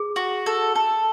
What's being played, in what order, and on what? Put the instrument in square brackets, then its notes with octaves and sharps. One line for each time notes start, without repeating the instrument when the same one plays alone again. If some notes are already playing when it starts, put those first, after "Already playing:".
Already playing: [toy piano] G#4
[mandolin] F#4
A4
A4